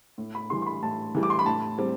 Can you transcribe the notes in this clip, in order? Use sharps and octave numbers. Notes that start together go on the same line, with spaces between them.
A2
B5
E3 G3 C6
C6
B5
A2 A5
E3 G3
D6
C6
B5
A2 A5
G3 C4